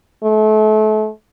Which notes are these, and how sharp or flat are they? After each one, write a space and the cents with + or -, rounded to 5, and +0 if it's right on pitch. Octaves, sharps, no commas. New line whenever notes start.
A3 -35